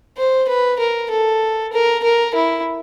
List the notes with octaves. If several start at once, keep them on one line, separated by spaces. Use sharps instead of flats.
C5
B4
A#4
A4
A#4
A#4
E4